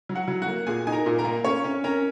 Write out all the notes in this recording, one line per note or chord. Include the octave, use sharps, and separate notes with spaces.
F#3
F#4 F#5
F#3
F#4 F#5
A#3
A#2 G#4 G#5
D#4 G#5
A#4 A#5
A#2
A#4 A#5
A#3
C#4 C#5 C#6
C#4
C#4 A#4 A#5